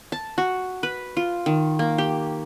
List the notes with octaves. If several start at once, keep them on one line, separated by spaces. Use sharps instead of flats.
A5
F#4
B4
F4
D#3
A#3
G4